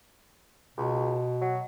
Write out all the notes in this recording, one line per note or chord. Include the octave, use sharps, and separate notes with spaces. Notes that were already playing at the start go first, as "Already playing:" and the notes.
C#2 B2
F#3